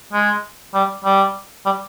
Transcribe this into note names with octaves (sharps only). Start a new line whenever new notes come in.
G#3
G3
G3
G3